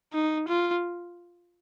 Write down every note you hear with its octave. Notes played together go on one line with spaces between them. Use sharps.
D#4
F4